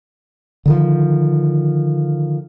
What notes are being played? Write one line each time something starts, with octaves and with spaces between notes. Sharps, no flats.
D3 D#3 F3